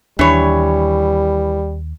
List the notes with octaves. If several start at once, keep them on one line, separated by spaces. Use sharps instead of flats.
D#2 E3 G3 D4 C#5